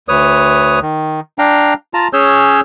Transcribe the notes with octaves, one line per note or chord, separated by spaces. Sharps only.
D2 B4 C#5 D#6
D#3
D4 F5 G5 A#5
F4 A5 A#5
C#4 G#4 C#5 E6 G6